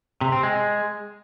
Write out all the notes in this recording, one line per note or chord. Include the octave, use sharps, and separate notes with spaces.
C3
C4
G#3